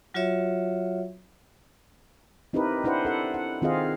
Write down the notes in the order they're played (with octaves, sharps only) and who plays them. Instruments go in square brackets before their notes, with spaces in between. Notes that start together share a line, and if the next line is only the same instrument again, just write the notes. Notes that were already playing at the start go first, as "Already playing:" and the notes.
[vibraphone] F#3 F4 F#4 C#5 E5
[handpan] C4 D#4 E4 G4 A#4 B4
D4 E4 B4 C5 F#5
A4 F#5
F#5
D#3 C4 F4 G#4 D#5 F5